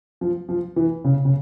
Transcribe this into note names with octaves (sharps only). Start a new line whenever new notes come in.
F3
F3
E3
C#3
C#3